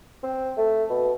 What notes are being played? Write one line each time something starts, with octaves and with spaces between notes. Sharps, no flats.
C4
A3
B2